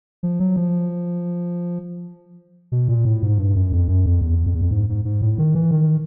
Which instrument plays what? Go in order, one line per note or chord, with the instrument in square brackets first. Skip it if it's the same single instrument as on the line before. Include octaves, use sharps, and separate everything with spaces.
[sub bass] F3
F#3
F3
B2
A#2
A2
G#2
G2
F#2
F2
F#2
F2
E2
F2
E2
F2
G#2
G#2
G#2
A2
D#3
E3
D#3